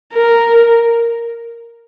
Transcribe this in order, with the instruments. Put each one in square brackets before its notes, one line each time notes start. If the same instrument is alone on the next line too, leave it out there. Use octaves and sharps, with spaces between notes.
[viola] A#4